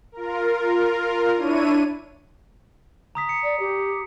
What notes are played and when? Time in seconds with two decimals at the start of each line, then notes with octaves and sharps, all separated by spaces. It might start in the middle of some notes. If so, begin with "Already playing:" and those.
0.12 F4 A#4
1.36 D4 E4 C#5 D#7
3.15 A#5 D#6 B6
3.29 C#7
3.44 D5
3.60 G4